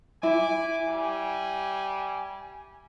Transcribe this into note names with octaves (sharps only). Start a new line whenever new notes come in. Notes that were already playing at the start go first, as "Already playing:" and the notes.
E4 G#5 B5 D6
G3 G#5